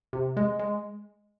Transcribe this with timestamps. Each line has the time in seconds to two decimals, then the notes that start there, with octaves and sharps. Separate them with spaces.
0.13 C3
0.37 G#3
0.59 G#3